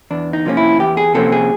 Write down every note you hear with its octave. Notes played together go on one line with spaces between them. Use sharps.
E2 D4
D#4
C3 F3 A#3 C#4
E4
E2 G4
G#4
C3 F3 A#3 C#4 A4
G#4